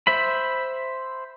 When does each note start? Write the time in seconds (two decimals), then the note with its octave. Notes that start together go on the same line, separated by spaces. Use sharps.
0.07 C5 E5 B5